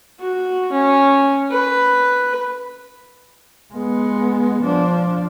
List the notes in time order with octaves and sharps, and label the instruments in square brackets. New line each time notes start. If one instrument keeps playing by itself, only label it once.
[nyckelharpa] F#4
C#4
B4
[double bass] G#3 B3
F3 D4